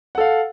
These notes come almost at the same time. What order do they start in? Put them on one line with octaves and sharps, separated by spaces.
F#5 A4 F5